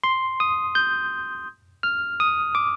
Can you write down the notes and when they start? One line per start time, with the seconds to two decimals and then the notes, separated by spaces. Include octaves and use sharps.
0.04 C6
0.40 D#6
0.75 G6
1.83 F6
2.20 D#6
2.55 D6